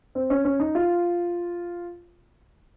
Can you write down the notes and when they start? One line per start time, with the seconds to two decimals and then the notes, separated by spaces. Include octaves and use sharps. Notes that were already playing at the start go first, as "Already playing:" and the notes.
0.15 C4
0.30 C#4
0.45 C#4
0.60 D#4
0.75 F4